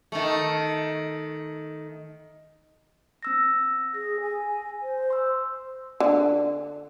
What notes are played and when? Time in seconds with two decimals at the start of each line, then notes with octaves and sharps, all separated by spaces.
0.12 D#3 A3
3.23 C4 E6 A#6
3.94 G#4 A#6
4.20 G#5
4.82 C5
5.10 C6 E6
6.00 D3